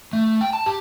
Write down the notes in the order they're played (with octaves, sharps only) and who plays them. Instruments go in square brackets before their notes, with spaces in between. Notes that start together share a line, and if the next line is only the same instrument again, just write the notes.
[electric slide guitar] A3
G5
A5
G4